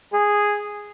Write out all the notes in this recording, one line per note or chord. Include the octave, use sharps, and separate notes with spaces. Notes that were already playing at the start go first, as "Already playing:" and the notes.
G#4